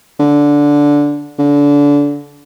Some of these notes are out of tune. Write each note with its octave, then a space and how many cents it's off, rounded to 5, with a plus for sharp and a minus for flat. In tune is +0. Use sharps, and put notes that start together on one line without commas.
D3 -10
D3 -25